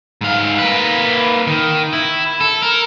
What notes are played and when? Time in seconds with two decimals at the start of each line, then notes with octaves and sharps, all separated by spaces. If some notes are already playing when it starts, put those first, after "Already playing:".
0.21 G#2 F5
0.58 A#3 B4
1.47 D#3
1.93 E4
2.41 A4
2.63 A#4